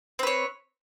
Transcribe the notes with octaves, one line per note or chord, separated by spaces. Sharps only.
C4 B4 C#5